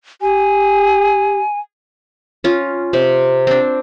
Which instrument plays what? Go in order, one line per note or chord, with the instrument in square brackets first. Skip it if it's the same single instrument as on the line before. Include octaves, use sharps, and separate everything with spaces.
[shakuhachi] G4 [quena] G#5
[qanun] C#4 F4
C3
C4 D4